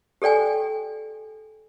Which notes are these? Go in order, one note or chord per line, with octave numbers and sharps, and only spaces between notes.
G4 A4 D5 G5 G#5